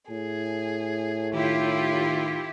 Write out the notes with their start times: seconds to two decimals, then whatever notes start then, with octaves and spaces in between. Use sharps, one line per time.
0.10 A2 G#4
1.34 D#3 E4 F4 G4